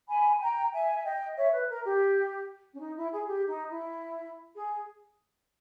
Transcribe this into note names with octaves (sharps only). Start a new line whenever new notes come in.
G#5 B5
G5 A#5
E5 G#5
E5
D#5 G5
C#5 E5
B4
A#4
G4
C#4
D#4
E4
G#4
G4
D#4
E4
G#4